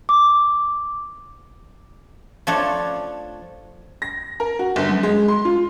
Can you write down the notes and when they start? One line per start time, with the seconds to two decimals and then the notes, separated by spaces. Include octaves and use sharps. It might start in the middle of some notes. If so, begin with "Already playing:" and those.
0.09 D6
2.47 F3 A3 D4 A4 C#5
4.02 A#6
4.40 A#4
4.59 F#4
4.76 G1
4.89 F#2
5.03 G#3
5.28 C6
5.45 F4